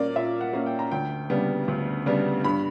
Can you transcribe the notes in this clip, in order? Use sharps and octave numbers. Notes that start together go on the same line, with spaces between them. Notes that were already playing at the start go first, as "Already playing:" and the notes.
Already playing: A#2 A#3 C#4 D5
A#2 E5
F#5
A#3 C#4
G5
A#5
D2 G5
C#3 G3 B3 D4
D2
C#3 G3 B3 D4
G2 B5